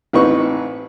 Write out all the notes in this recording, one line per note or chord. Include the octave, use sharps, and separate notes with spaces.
A1 C4 D#4 B4 C#6